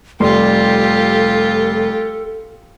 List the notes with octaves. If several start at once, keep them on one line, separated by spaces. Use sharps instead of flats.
F1 G3 F4 G4 A4 C6